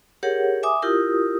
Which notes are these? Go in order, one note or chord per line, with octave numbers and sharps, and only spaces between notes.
G4 G#4 A#4 C#5 F#5
E5 G#5 D6 D#6
E4 F4 G4 A#4 D#6